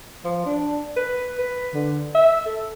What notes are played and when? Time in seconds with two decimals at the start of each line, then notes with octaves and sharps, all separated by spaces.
0.25 F3
0.46 D4
0.96 B4
1.38 B4
1.74 D3
2.15 E5
2.46 A4